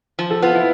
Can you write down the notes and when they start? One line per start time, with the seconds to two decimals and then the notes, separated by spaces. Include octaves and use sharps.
0.19 F3
0.31 A4
0.42 B3 F4
0.55 E4